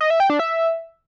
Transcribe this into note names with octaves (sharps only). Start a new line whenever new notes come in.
D#5
E5
G5
D4
E5